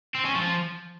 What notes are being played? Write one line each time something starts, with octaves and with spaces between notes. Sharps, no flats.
C4
C#4
F3